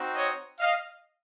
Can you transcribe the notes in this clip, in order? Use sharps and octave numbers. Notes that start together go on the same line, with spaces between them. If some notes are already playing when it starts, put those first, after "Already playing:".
Already playing: C4 D#4 F#4
C#5 D#5
D#5 F5